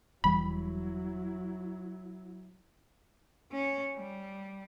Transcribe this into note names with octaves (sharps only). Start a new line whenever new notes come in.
E1 E3 F#3 G3 E4 B5
C#4
G3